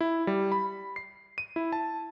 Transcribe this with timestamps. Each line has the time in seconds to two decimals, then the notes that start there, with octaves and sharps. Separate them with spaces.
0.01 E4
0.27 G3
0.52 B5
0.96 C7
1.38 D#7
1.56 E4
1.72 A5